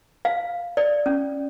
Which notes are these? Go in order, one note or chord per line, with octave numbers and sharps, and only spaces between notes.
F5
D5
C#4